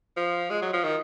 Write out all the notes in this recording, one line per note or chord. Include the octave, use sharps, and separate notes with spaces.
F3
G#3
F#3
F3
D#3